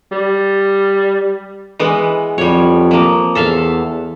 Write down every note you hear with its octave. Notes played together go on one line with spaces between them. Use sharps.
G3
E3 G#3 B3
F2 G3 C#5
F3 A#3
E2 A4 E5 F5